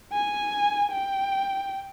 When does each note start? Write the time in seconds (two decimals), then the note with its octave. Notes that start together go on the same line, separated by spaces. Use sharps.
0.13 G#5
0.92 G5